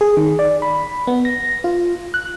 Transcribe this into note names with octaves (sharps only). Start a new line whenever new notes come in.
G#4
D#3
D5
B5
B3
A#6
F4
F#6